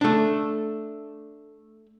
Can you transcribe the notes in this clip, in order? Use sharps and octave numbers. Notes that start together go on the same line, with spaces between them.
A3 D4